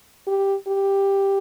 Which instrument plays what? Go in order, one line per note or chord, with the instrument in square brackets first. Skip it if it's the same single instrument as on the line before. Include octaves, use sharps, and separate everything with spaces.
[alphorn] G4
G4